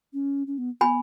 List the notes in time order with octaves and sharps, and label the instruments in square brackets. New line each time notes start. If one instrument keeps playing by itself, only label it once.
[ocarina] C#4
C#4
B3
[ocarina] B3 [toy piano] G#5 B5